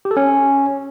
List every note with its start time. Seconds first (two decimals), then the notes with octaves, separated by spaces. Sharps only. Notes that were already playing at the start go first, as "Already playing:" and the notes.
0.05 G4
0.11 A4
0.17 C#4